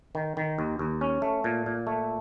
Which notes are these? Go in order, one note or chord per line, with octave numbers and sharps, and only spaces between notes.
D#3
D#3
D#2
D#2
C#4
A3
A#2
A#2
A3